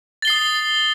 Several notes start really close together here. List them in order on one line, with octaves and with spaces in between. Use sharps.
A6 G7 C7 D#6